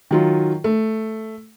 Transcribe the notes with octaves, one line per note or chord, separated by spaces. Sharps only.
D#3 F#3 F4
A3